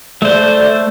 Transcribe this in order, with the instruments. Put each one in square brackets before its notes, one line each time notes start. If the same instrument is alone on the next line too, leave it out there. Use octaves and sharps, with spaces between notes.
[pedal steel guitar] A3 C5 [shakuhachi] D5